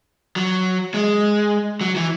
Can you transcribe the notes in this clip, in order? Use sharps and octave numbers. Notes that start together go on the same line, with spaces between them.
F#3
G#3
F#3
E3